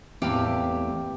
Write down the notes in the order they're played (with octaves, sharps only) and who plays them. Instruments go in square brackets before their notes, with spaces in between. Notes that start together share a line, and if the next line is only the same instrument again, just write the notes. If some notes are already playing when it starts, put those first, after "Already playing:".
[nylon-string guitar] E2 [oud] A2 F4 [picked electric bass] E3 A#3 C4 [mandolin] G4